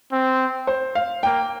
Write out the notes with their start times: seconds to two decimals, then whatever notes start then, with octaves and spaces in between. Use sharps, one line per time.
0.12 C4
0.67 C5
0.95 F5
1.23 A#3 G5